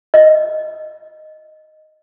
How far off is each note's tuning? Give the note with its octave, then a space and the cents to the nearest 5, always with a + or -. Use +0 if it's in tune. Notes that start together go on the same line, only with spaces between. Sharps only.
D#5 -5